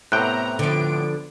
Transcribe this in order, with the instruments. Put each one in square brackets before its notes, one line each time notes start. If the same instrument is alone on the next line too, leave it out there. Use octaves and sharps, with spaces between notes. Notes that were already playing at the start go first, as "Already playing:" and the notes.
[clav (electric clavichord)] A2 C3 G5 [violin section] B3 A#5 [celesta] F#6
[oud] D3 F3 [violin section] B3 D7